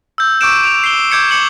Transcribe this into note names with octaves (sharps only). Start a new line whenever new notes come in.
E6 G6
C#6 D6 E6 G6 D7 E7
D7 F7
C7 G7
D6 G6 G#6 C#7 D7
D6 C#7 E7 F#7